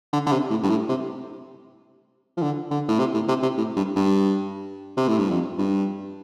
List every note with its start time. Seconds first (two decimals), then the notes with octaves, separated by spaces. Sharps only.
0.13 D3
0.26 D3
0.32 C3
0.50 A2
0.63 G2
0.70 A2
0.89 C3
2.37 F3
2.42 D3
2.71 D3
2.88 A2
2.99 C3
3.14 A2
3.28 C3
3.43 C3
3.57 A2
3.76 G2
3.96 G2
4.97 C3
5.08 A2
5.18 G2
5.30 F2
5.59 G2